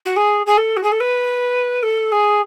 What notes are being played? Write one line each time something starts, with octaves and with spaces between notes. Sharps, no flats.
F#4
G#4
G#4
A4
F#4
G#4
A4
B4
A4
G#4